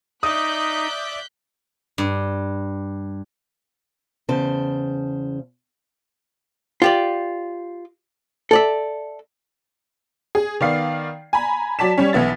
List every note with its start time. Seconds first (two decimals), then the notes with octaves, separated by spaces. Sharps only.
0.23 D#4 D5 E5 D6 D#6 F#6 G6 B6
1.98 G2
4.29 E2 C#3 C5 A5
6.82 F4 G4 D5
8.51 A4 D5 E5
10.35 G#4
10.61 D#3 B3 D5 F5 C7
11.33 G#5 A#5 B5
11.79 F#3 D5 A5 B6 E7
11.98 G3 C#4
12.13 B1 E3 B3 E4 A6